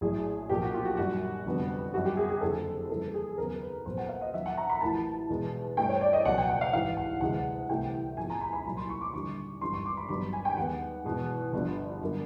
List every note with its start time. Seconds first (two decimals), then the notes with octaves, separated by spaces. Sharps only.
0.01 A#1 A2 F#3 G#4
0.49 B1 A#2 F3 G4
0.62 F#4
0.74 F4
0.85 F#4
0.97 F#2 D#3 G3 F#4
1.45 F1 F2 D3 G3 B3
1.94 F#2 D#3 G3 F#4
2.05 G4
2.17 G#4
2.30 G#4
2.41 F#1 F2 D3 F3 A4
2.89 F2 C#3 E3 G3 A#3 A4
3.14 G#4
3.37 D#2 C#3 F#3 B3 A#4
3.62 B4
3.86 A#1 A#2 F#3 B3 C5
3.97 F#5
4.09 F5
4.21 D#5
4.33 D#2 D#3 F#3 E5
4.46 F#5
4.57 A#5
4.69 B5
4.81 A1 A2 F3 A#3 A5
5.29 E2 B2 G#3 B3
5.77 G2 E3 A3 G5
5.89 C#5
6.01 D5
6.13 D#5
6.25 C#2 B2 F#3 F#5
6.38 G5
6.49 F#5
6.61 F5
6.73 A1 G#2 E3 F5
6.97 F#5
7.21 D2 C3 E3 G#3 F#5
7.69 C2 C3 E3 A3 G5
8.17 A#1 G#2 F3 G#3 B3 G#5
8.30 A#5
8.41 B5
8.53 B5
8.65 C2 A#2 F#3 B5
8.77 C6
8.89 C#6
9.01 D6
9.13 D#2 D3 G3 C#6
9.61 G#1 G2 E3 C6
9.73 C#6
9.85 D6
9.97 B5
10.08 G#1 G2 D#3 F#3 B3 B5
10.33 G#5
10.45 G5
10.57 D#2 D#3 G#3 B3 F#5
11.05 E2 B2 G#3
11.53 G1 G2 D3 F3
12.01 F#2 D3 G3 A#3